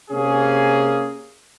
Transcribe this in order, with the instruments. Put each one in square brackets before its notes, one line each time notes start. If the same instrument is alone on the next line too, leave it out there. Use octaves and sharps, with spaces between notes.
[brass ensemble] C3 A#3 C#4 G#4